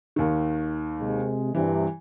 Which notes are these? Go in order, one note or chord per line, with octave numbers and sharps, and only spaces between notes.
D#2 D#3
C3 G#3
G2 C3 E3